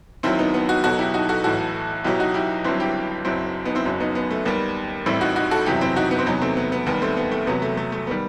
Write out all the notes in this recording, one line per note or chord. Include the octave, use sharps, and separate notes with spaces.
D#2 D#3 F#3 C4 E4
B3 D#4
B3
D#4 F#4
B1 B2 F#3 F#4 A4
E4 G4
D#4 F#4
F#4 A4
B1 A2 E3 F#4 A4
B1 B2 F#3 E4 G4
D#4 F#4
E4 G4
G1 G2 F#3 C4 E4
E4 G4
F#1 F#2 F#3 C4 E4
B3 D#4
C4 E4
F#1 F#2 F#3
B3 D#4
B3
A3
D#2 D#3 G3 B3
A1 A2 G3 C4 E4
D#4 F#4
D#4 F#4
F#4 A4
F#1 E2 C3 F#3 E4 G4
C4 E4
D#4 F#4
B3
C4
E2 C3 F#3 B3 D#4
A3 C4
B3
B3
D#2 D#3 G3 B3
A3 C4
B3
A3
E2 C3 F#3 B3
A3
A3
A3
D#3 G3 B3